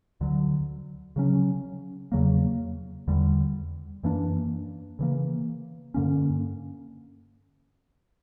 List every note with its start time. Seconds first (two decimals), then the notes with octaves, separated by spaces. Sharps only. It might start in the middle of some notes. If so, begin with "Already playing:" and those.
0.21 D2 D3 F#3
1.16 C#3 F#3 C#4
2.12 E2 C#3 F#3 A#3
3.08 E2 D3 G3
4.03 F#2 E3 A#3 D4
4.99 C#3 E3 A#3
5.94 G2 D3 A#3 C#4